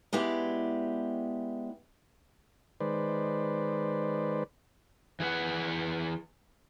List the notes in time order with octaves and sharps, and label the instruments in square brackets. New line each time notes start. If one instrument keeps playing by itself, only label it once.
[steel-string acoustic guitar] G#3 B3 E4 G4 D5
[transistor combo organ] D#3 G#3 B4 C5 D5
[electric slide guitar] E3 G#4 B4 F#5